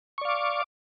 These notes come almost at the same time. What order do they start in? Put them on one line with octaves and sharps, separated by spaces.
C#6 D5 F5 D6